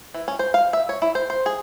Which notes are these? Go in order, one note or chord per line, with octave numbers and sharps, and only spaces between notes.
E3
C#4
C5
F5
E5
C#5
E4
C5
C5
G#4